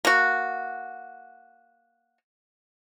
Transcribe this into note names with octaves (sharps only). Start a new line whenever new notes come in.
A#3 F#4